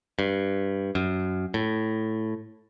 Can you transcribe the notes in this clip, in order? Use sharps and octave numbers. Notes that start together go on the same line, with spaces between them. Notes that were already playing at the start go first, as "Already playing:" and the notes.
G2
F#2
A2